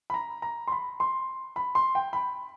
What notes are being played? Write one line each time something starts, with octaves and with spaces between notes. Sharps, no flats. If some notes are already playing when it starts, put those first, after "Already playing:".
B5
A#5
A#5
C6
B5
C6
B5
C6
G5
B5